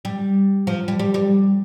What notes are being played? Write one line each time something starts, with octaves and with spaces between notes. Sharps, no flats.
G3
F3
G3
G3
G3